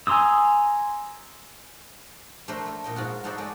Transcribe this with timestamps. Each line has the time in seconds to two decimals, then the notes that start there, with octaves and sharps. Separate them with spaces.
0.07 G#5 A#5 C6 D#6 E6
2.48 A3 D4 A#4 C5 E5
2.65 A3
2.84 A#2 D#5 G5
2.96 G#2 F4 F#4
3.24 D#4 F#4 A4 C5 D5 E5
3.38 G#3 A3 D5